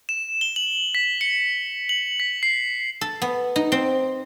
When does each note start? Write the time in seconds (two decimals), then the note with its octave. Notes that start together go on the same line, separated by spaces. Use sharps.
0.09 E7
0.41 G7
0.56 F#7
0.95 B6
1.21 C#7
1.89 F#7
2.20 B6
2.43 C7
3.01 A4
3.22 B3
3.56 D#4
3.72 C4